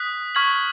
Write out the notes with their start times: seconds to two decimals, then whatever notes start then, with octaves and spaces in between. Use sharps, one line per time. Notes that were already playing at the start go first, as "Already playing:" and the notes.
Already playing: D#6 F#6 B6
0.35 C#6 F6 G#6 B6 F#7